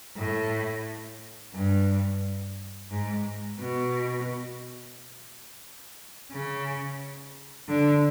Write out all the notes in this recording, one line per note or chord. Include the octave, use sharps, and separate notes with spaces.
A2
G2
G#2
B2
C#3
D3